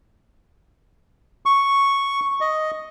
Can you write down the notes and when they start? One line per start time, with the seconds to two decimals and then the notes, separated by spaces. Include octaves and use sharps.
1.46 C#6
2.41 D#5